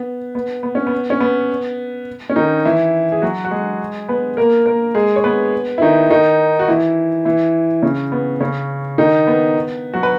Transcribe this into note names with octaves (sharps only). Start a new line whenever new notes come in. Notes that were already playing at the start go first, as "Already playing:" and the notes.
Already playing: B3
B3
B3
C#4
B3
C#4
B3
C#4
D#3 D#4
E3 E4
G#4
F#3 F#4
F#4
G#3 G#4
B3 B4
A#3 A#4
A#3 A#4
G#3 G#4
C#5
B3 B4
E4
D#3 D#4
D#3 D#4
F#4
E3 E4
E3 E4
C#3 C#4
B3
C#3 C#4
D#3 D#4
B3
F#3 F#4
B4